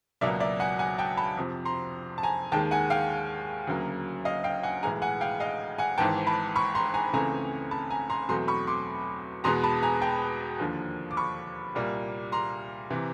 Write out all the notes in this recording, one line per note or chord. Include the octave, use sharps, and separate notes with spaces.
C#2 B2 F#3 A#3 D5 E5
D5 E5
F#5 G#5
F#5 G#5
G5 A5
A5 B5
F2 C3 F3
A#5 C6
A5
G#5 A#5
D#2 D#3 G#3 G5 A5
F#5 G#5
F5 G5
D2 C#3 F#3 A#3
D#5 F5
F5 G5
F#5 G#5
B1 A2 E3 G#3 G#5 A#5
F#5 G#5
F5 G5
D#5 F5
F#5 G#5
G#1 G#2 E3 G5 A5
A5 B5
B5 C#6
A#5 C6
G#5 A#5
C#2 C#3 E3 A3 C4 G#5 A#5
A5 B5
G#5 A#5
A#5 C6
E2 B2 F#3 A3 C4 A#5 C6
B5 C#6
C6 D6
E2 B2 G#3 B3 A#5 C6
A5 B5
G#5 A#5
G5 A5
D#2 D3 F3 A#3
D6
B5 C#6
C2 A#2 G3 A#3
A#5 C6
C3 E3